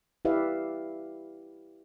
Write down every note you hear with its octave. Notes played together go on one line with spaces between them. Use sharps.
E4 G4 B4 D5 E5 F5